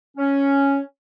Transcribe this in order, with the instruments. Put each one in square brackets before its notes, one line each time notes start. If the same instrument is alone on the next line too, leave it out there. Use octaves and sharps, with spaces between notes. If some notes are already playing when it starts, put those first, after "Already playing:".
[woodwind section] C#4